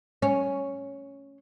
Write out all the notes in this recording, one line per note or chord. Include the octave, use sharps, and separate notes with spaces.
C#4